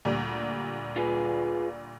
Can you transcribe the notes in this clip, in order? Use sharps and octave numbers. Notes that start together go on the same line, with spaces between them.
D2 A#2 G3
F4 G#4 B4